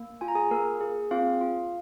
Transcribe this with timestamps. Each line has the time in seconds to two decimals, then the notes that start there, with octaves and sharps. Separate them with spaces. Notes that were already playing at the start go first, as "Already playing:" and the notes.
Already playing: A#3
0.21 F4 G#5
0.28 A#5
0.35 G#4 G#5
0.51 A#3 A#4
0.81 G#4
1.11 C4 F4 F5
1.41 F4